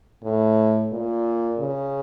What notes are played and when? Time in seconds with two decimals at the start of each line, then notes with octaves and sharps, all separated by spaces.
0.24 A2
0.92 A#2
1.58 C#3